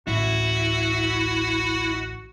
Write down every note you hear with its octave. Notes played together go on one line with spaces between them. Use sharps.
A1 D2 E4 F#4